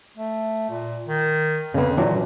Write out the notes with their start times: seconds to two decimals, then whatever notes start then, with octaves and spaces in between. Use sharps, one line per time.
0.17 A3
0.70 A#2
1.08 D#3
1.74 F2 C#3 B3
1.98 A#2 E3 F#3 D4